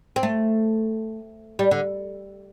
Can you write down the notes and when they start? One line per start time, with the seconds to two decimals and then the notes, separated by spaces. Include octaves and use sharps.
0.16 C4
0.23 A3
1.59 G3
1.71 D3